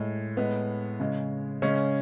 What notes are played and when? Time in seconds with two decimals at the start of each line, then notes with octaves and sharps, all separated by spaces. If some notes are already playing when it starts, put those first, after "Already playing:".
Already playing: A2 G#3
0.37 A2 G#3 B3
1.00 C#3 G#3
1.62 C#3 G#3 C#4